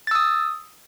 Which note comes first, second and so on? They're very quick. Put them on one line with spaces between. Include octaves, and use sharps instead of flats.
A6 E6 D#6